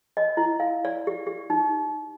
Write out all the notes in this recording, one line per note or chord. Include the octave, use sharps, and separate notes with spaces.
D#5
E4
F5
D5
G4
G4
D#4